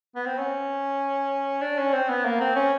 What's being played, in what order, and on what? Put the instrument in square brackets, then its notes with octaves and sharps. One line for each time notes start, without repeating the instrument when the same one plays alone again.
[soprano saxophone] B3
C4
C#4
D4
C#4
C4
B3
A#3
C4
C#4